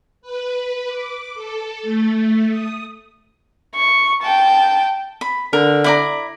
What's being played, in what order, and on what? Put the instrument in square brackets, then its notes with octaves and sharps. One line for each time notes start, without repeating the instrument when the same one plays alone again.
[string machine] B4
D6
A4
A3
D#6
[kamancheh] C#6
G5 A5
[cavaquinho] B5
[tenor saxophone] D3 [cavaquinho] A#4
[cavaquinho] E4 D5 A#5